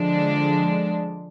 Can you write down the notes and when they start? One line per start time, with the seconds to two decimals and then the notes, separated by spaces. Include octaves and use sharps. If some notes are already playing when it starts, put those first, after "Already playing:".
Already playing: D3 F3 G#3 D4